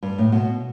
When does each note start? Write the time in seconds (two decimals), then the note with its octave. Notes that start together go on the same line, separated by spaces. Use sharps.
0.03 G2
0.18 A2
0.32 B2